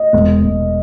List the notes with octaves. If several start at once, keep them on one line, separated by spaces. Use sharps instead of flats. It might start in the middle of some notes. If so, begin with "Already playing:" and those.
Already playing: D#5
E1
E1